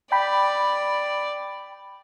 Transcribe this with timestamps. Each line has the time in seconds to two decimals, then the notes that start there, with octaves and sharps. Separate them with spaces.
0.12 D5 G5 B5